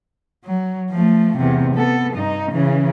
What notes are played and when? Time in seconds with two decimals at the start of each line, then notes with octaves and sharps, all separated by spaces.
0.45 F#3
0.90 F3 A3
1.37 E2 C3
1.74 B3 A4
2.14 G2 D#4
2.52 C#3 E3